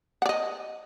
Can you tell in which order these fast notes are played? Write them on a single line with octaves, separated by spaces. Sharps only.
F#5 D5 D#5